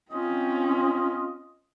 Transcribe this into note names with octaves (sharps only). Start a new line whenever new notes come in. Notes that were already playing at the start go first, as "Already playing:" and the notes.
C4 C#4 F4 D#5